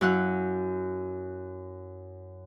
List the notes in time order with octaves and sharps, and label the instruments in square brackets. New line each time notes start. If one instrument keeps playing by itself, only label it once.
[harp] F#2 E4 F5 F#5 F#6